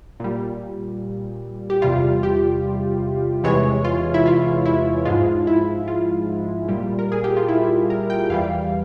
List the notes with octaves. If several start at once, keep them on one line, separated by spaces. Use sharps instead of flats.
A#2 G3
G4
E2 C3 G3 F4
G4
E2 C3 E3 G#3 C#5
F4
E4
F4
E4
G#2 F3 G#3 F4
E4
F4
A#2 G3
A#4
G#4
G4
F4
E4
A#4
G5
E2 E3 G3 F5